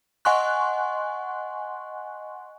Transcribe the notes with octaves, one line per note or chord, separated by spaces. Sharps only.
D#5 F#5 G#5 C6 C#6 F#6